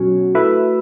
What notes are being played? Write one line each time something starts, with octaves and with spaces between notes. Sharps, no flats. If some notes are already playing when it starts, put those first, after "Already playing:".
Already playing: B2 F#3 C#4 F#4 C#5
A3 E4 B4 E5